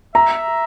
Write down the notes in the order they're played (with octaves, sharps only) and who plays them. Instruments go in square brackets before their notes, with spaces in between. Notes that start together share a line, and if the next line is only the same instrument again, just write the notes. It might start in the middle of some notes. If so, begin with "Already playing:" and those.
[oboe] E5 [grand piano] A#5